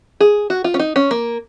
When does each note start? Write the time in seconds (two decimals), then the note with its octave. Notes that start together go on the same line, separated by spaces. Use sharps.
0.20 G#4
0.50 F#4
0.64 F4
0.74 C#4
0.79 D#4
0.96 C#4
1.11 A#3